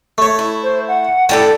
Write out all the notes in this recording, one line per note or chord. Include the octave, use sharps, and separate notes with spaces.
A3 C#5
E4
C5
F#5
A2 G3 A4 D5 G5